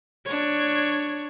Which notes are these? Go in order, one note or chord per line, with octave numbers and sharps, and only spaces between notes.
D4 C#5